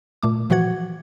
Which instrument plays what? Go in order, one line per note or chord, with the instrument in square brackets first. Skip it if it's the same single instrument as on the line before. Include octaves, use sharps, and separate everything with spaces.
[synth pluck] A#2 A3 D6
A#2 E3 F3 F#4 F#5 G#6